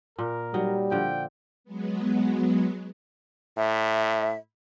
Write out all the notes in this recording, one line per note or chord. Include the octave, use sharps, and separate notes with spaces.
A#2 A#4
F#3 G3 D#4
D3 F3 G5
F#3 G#3 B3
A2 E5